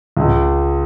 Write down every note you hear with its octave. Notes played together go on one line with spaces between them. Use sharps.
C#2